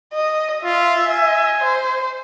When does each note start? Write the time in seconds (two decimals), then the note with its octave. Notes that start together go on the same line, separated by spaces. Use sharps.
0.14 D#5
0.64 F4 E5
1.07 G#5
1.60 C5